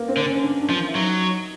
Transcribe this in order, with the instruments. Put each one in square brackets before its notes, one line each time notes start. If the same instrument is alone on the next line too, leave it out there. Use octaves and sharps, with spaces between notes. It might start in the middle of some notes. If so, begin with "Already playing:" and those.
Already playing: [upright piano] A#3
C4
[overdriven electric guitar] D3
[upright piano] C#4
D4
D4
[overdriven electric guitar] F3
[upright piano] E4
[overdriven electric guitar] F#3 [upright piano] D#4